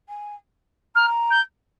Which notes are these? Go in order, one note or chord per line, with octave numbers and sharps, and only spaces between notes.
G#5
A#5 F6
G6